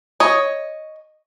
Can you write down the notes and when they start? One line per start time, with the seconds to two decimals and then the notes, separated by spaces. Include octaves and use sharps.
0.20 C#5 D#5